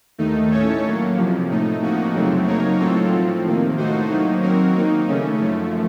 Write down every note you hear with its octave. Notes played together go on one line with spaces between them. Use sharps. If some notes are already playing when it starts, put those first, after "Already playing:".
D#2 D#3 A3 D#4
A2 A3 C#4 A4 C#5
A2 F#3 A#3
F2 C3 F3
A2 A3 D#4
C3 F3 A#3 D#4 F#4
F#2 C#3 F#3 A3 C4
F#3 A#3 D#4 A#4 C#5
A2 F#3 C4 F4 A4
A2 F3 C4
C3 D#3 A#3
A2 A3 D#4 F#4 C5
D#3 F#3 A#3 D#4
F#3 C4 F#4 A#4
D#3 A#3 D#4
C#3 A3 C#4
F#2 F3 A3